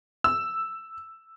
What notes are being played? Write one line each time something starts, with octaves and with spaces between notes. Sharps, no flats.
E6